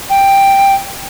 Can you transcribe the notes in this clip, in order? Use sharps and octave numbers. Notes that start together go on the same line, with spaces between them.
G5